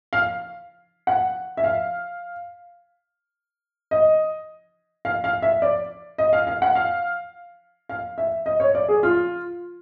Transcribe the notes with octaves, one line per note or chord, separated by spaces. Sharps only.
F5
F#5
E5
F5
D#5
F5
F5
E5
D5
D#5
F5
F5
F#5
F5
F5
E5
D#5
C#5
D5
G#4
F4